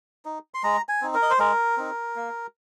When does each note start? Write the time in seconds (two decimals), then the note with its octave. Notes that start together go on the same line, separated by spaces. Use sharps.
0.25 D#4
0.54 C6
0.63 G#3 A#5
0.89 G#5
1.02 C4 D#4
1.14 A#4
1.23 D#5
1.30 C5
1.39 G#3 A#4
1.77 C4 D#4
2.16 A#3